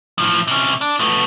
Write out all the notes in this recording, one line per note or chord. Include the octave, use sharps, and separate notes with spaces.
A2 F3
C3 C#4
D4
A3 B3